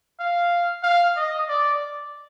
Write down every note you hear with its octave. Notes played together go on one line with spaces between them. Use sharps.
F5
F5
D#5
D5